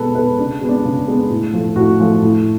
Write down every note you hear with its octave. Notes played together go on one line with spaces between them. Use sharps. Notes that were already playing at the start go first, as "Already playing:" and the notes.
Already playing: B2 G#3 B3 A4 B4
G#3 B3 B4
C#3 D4
G#3 B3
D4
C#3
G#3 B3
A2
F3 A3
A2 F#4
F3 A3
A2